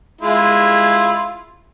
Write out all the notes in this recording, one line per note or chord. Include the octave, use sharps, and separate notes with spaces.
G#3 E4 F4